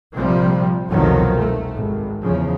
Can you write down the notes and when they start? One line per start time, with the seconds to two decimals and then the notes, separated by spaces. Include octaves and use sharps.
0.14 A#1 C3 F3 G3
0.90 F1 C2 B2 D#3 F3 F#3
1.38 A3
1.75 G#1
2.22 E2 C#3 F3